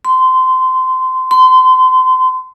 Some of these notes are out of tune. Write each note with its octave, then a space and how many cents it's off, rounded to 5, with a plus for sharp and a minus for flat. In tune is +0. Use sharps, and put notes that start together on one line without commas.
C6 -20
C6 -30